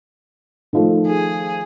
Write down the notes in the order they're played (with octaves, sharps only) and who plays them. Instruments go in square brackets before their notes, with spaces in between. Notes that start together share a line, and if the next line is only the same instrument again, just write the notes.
[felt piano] D#3 F3 A3
[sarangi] G#4